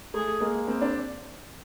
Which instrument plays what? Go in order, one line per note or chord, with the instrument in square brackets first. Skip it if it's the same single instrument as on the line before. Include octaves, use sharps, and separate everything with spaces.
[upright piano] A3 [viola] G#4
[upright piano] G#3 A#3
A#3 C4
C4 D4